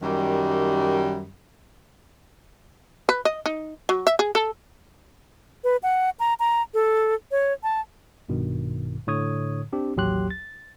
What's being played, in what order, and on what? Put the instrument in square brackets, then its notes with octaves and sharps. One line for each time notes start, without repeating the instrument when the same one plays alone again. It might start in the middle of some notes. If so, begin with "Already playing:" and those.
[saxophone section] F#2 D#3 G3
[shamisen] B4
D#5
D#4
F#3
E5
G#4
A4
[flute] B4
F#5
A#5
A#5
A4
C#5
A5
[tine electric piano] A#1 G2 B2 D#3
A2 D3 C#5 D#6 G#6
C4 D4 G4
A1 D#2 F#3 G4 C6 F#6
A6